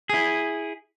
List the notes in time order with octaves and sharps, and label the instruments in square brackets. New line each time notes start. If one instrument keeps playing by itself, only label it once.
[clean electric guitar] E4 G#4